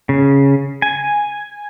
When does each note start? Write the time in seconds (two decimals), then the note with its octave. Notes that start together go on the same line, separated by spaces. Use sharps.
0.09 C#3
0.82 G#5